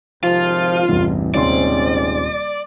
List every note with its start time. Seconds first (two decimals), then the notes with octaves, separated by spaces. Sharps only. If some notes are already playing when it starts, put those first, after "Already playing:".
0.24 G#1 C3 F3 F4
0.88 A1 E2 G2 C3
1.34 D#1 G#2 C3 C4 C#4 D5 C6